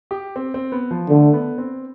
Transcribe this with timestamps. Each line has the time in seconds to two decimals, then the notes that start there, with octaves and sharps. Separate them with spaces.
0.11 G4
0.36 C4
0.54 C4
0.72 B3
0.91 F3
1.09 D3 A3
1.33 B3
1.58 C4